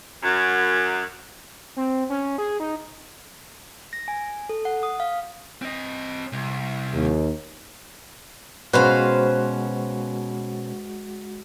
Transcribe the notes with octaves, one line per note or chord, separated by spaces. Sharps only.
F#2
C4
C#4
G#4
D#4
A#6
G#5
A4
F#5
D#6
F5
C4 D#5
C2
D#2
B2 G#3 C#4 F#4 B4 C5 F5